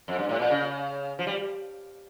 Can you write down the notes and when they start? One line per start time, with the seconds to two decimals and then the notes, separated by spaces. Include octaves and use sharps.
0.08 F2
0.19 G2
0.29 A2
0.39 A#2
0.50 C#3
1.19 F3
1.27 G3